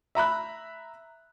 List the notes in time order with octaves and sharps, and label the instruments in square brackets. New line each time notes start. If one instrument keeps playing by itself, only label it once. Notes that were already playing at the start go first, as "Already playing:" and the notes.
[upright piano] E5 A#5 B5 F#6